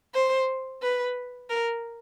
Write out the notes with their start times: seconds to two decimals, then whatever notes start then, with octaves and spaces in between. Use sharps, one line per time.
0.14 C5
0.82 B4
1.50 A#4